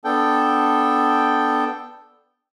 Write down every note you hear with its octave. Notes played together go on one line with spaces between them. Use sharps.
B3 D4 A4 G5